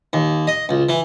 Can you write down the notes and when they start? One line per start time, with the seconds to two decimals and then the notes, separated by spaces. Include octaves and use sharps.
0.13 D#2
0.47 D#5
0.69 C#2
0.89 E3